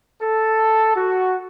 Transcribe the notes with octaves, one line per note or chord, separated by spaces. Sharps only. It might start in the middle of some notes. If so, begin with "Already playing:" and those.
A4
F#4